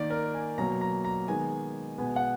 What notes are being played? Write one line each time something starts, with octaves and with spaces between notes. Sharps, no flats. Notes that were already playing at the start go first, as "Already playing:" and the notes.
Already playing: D#3 A#3 D5
A#4
G#5
B2 F#3 A#3 A#5
A#5
A#5
D#3 G#3 B3 G#5
B2 G#3 B3 G#5
F#5